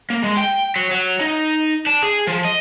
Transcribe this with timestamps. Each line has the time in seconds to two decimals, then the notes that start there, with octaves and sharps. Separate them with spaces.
0.10 A#3
0.24 G#3
0.37 G5
0.76 F#3
0.91 F#3
1.21 D#4
1.87 D4
2.03 G#4
2.27 F3
2.45 D#5